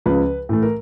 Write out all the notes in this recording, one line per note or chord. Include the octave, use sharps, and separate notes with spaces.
C#2 C#3 F3 B4
A2 E3 A3
A#4